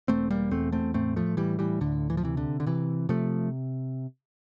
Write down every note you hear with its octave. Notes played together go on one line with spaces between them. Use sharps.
E1 A3 C4
G3 A#3
E2 A3 C4
A3 C4
A2 A3 C4
F3 A3
A2 E3 G3
E3 G3
D2 D3
E3
F3
C3 E3
D3
D3
C3 E3
C3 F3 A3